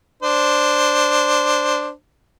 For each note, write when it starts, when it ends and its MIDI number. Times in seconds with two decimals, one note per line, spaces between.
0.23 1.91 62
0.23 1.91 72